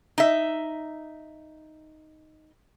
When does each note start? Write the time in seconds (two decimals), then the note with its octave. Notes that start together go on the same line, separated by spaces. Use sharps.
0.18 D#4 E5